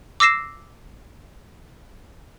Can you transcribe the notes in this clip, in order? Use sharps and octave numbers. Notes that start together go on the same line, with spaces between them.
D6 E6 A#6 C7 E7